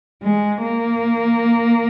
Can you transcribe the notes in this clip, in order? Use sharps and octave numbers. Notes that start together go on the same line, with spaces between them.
G#3
A#3